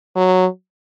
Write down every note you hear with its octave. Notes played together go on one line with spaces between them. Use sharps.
F#3